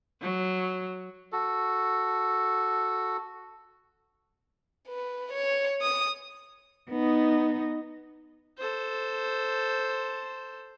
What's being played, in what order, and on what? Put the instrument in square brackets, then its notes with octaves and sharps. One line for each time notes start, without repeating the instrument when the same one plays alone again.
[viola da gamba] F#3
[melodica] F#4 A4
[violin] B4
C#5
D#6
[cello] B3 D#4
[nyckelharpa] A4 C5